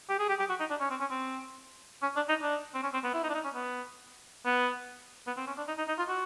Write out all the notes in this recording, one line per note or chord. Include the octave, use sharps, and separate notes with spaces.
G4
G#4
G4
G4
F#4
D#4
D4
C#4
C4
C#4
C4
C#4
D4
D#4
D4
C4
C#4
C4
B3
E4
D#4
D4
D#4
C#4
B3
B3
B3
C4
C#4
D4
D#4
D#4
D#4
F4
F#4